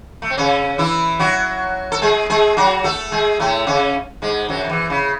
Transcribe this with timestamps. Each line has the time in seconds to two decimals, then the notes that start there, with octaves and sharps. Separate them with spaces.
0.22 A3
0.30 C4
0.37 C#3 C#4
0.78 E3 E4
1.19 F#3 F#4
1.92 A4
2.02 G#3 G#4
2.30 G#3 G#4
2.57 F#3 F#4
2.84 A3 A4
3.12 G#3 G#4
3.39 A2 A3
3.67 C#3 C#4
4.22 G#2 G#3
4.49 F#2 F#3
4.64 F#3
4.69 E2 E3
4.90 C#3